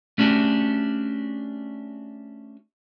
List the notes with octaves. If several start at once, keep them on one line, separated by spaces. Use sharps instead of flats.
A3 C#4 D4 F#4 G4